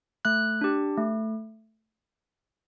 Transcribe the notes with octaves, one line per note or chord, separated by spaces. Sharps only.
A3 F#6
D4 G4
A3